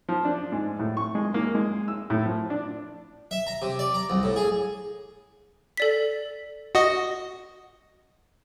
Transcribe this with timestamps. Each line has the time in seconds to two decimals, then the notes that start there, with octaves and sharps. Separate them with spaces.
0.09 F3
0.25 D4
0.52 G#2
0.79 A2
0.97 C#6
1.15 G#3
1.34 A#3
1.55 G#3
1.88 E6
2.10 A2
2.26 F3
2.50 D4
3.31 E5
3.47 A#5
3.62 C3
3.79 D5
3.94 A#5
4.10 C2
4.23 A2
4.36 G#4
5.77 A4 D5 B6
6.75 F#4 D#5